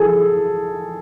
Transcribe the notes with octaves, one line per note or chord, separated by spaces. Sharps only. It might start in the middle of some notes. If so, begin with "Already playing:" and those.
Already playing: G#4 A4